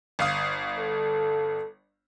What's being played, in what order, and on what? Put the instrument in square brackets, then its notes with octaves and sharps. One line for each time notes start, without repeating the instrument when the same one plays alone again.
[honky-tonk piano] G1 F5 D#6
[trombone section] A4